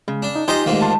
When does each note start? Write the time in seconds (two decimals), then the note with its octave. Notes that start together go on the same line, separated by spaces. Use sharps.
0.08 C#3 G#3
0.23 D4
0.36 D#4
0.48 D#4 F4 G4 C5 D#5 G#5
0.66 D2 G#2 D#3 A3 A#3 G4
0.81 F4 A5